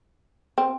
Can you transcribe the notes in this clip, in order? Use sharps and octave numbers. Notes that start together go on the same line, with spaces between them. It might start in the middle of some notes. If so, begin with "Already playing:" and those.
C4